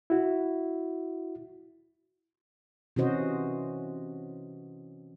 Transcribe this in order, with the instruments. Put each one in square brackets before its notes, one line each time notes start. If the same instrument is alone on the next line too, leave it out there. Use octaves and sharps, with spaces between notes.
[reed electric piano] E4 F#4
[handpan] C3 E3 C#4 F#4 C5 D#5